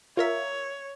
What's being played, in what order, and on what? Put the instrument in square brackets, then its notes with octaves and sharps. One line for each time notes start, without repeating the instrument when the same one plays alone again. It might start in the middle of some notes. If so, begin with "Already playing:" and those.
[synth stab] F4 A#4 E5 [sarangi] C#5